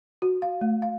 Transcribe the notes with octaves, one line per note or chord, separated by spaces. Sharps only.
F#4
F5
A3
F5